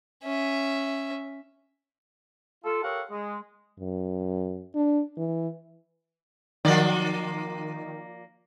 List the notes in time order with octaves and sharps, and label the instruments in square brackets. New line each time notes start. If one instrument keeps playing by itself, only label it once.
[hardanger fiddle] C#4 E5
[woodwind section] F4 A4
G4 A4 A#4 C#5 F5 F#5
G#3
[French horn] F#2
D4
E3
[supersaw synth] D#3 [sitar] F3 A#3 D5